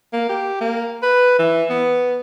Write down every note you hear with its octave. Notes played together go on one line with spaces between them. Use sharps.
A#3
G4
A#3
B4
E3
B3